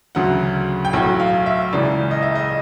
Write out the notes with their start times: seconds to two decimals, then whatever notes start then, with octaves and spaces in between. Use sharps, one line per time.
0.15 D2 C#3 F#3 F#5
0.85 G5
0.93 B1 A2 F#3 F#5
1.20 F5
1.46 E5
1.73 C#2 C#3 E3 D5
2.11 D#5
2.22 E5
2.35 D#5